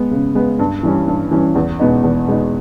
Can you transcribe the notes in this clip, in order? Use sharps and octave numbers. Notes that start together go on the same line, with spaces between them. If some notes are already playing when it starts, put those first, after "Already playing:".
Already playing: G#3 B3
C#3
G#3 B3
G2
E3 G3 C#4
G2
E3 G3 C#4
E2
B2 G#3 B3 D#4
E2
B2 G#3 B3 D#4